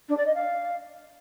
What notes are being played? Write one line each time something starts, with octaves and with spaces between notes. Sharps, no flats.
D4
D5
D#5
F5